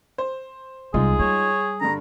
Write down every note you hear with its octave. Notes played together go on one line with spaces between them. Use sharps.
C5
C2 G#3 D#4 F4 G#4
G3 C#5
G2 D3 A#5